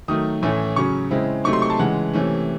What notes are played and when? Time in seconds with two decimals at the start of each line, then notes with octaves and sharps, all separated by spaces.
0.08 D#3 F#3 A3 D#6
0.42 A2 E3 A3 C#4 E4
0.76 C#3 F#3 C#4 C#6
1.11 C#3 G#3 C4 E4
1.44 C3 F#3 A3 D#4 C#6
1.53 C6
1.62 C#6
1.70 A5
1.79 C#3 E3 G#3 F#5
2.13 C3 E3 A3 C#4